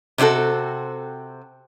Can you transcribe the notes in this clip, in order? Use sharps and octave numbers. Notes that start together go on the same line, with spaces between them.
C3 C4 D4 F#4 A4